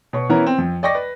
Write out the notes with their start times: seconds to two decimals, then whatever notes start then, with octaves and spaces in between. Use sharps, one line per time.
0.13 B2 C#5 C#6
0.29 E3 B3 C#4 E4 A#4 B4
0.46 C4
0.58 F2
0.83 D5 D#5 G5 C#6 D6 A#6
0.95 B4